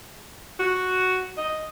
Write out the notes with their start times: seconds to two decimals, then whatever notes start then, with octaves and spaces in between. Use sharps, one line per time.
0.59 F#4
1.37 D#5